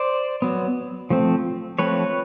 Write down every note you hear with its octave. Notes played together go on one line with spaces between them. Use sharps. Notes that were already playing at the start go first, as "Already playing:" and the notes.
Already playing: C5 D5
F#3 B3
F3 A3 C4
F3 A3 C4 B4 C#5